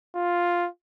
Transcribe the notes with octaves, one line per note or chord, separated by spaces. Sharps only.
F4